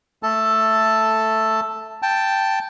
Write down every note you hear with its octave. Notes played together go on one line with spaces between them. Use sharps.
A3 A4 A5
G5 A5